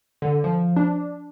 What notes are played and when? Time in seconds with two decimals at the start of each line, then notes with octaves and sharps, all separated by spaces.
0.22 D3
0.44 F3
0.77 D4